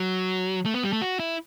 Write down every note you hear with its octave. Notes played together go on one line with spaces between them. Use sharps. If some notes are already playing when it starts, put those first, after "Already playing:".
Already playing: F#3
A3
B3
G3
A3
F#4
E4